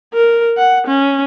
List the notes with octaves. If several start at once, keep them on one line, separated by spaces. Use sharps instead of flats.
A#4
F#5
C#4